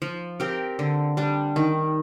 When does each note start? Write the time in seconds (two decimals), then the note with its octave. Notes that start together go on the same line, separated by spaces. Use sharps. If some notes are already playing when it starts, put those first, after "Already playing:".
0.02 F3
0.40 C4 G4 A#4
0.79 D3
1.17 G3 D4
1.56 D#3